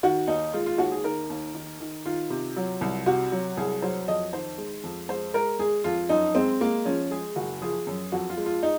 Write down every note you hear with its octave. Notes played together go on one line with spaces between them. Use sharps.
D#3 F#4
D#2 D#4
G#3 F4
F4
D#2 F#4
G#4
D#3 A#4
D#2
D#3
D#3
D#3 F4
C3
F#3
C2
C3 F#4
F#3
C2 G#4
F#3 C5
F2 D#5
D#3 C5
G#3
F2
G#3 C5
G#3 A#4
G#3 G#4
F2 F4
F#2 D#4
G#3 C4
G#3 A#3
F3 C#4
G#3 G#4
F#1 F#4
F3 G#4
F#2
F2 F#4
F4
G#3
F4
D#4